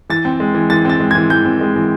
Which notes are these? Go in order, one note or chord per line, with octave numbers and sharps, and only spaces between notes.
E3 A6
C4
G#3
E3
E3 A6
C4 A6
G#3
E3 G#6
E3 G6
C4
G#3
E3